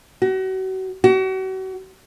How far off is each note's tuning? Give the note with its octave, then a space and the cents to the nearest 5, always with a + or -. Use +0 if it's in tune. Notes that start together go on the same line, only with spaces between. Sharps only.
F#4 +35
F#4 +40